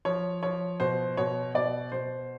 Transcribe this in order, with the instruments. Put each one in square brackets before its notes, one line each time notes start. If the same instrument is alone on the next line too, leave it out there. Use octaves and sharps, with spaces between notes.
[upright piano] F3 C#5
F3 C#5
B2 C5
B2 C#5
B2 D5
B2 C5